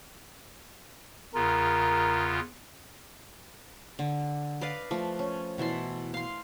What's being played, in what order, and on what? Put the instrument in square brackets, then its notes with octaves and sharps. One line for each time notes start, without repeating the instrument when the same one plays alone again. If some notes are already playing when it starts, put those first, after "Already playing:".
[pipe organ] E2 C#3 F4 [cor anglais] A#4
[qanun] D3
B4 D5 D#5 F5
F3 A3
C#4
B2 E3 A4 C6
F5 C6